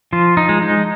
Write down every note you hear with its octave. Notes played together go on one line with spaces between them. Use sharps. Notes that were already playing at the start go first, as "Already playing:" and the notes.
F3 F4
D#4
G#3
D#4